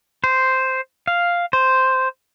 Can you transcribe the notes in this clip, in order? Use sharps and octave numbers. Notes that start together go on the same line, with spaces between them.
C5
F5
C5